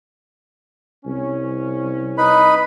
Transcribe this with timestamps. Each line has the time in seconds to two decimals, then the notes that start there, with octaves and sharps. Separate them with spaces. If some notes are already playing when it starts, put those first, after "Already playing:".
1.05 C2 C#4
2.18 D#4 B4 B5